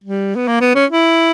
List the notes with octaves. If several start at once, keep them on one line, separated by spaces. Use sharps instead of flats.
G3
B3
A#3
B3
C#4
E4